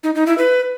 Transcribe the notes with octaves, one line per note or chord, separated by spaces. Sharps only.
D#4
D#4
E4
B4